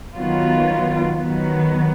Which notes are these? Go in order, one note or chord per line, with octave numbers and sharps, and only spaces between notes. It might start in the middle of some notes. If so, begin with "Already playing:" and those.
D#3 F#3 B3 F4
D#3 F#3 B3